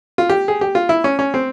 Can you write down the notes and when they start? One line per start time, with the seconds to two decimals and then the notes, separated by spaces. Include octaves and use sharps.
0.18 F4
0.29 G4
0.48 G#4
0.61 G4
0.75 F4
0.89 E4
1.04 C#4
1.19 C#4
1.34 C4